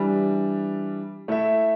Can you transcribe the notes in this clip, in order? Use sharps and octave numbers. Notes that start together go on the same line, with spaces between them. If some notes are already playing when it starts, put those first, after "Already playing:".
Already playing: E3 G3 D4
A3 E4 A4 E5